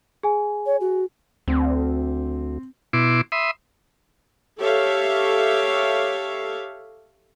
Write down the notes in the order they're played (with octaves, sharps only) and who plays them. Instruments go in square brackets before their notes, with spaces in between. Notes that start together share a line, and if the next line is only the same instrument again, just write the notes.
[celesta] G#4 G#5
[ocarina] C#5
F#4
[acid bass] D2 [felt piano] C4
[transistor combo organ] B2 E4 C6 D6
E5 B5 C6 D#6
[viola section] G4 A4 C#5 E5 F5